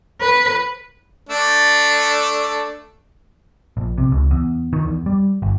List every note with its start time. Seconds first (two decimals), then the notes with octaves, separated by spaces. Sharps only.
0.21 B4
1.29 A3 D4 A4
3.77 A#1
3.98 C3
4.12 C#2
4.31 E2
4.73 D#3
4.85 E2
5.06 G3
5.42 G1